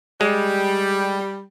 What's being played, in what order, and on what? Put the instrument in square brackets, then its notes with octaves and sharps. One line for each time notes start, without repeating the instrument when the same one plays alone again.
[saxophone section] G3 [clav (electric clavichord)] G#3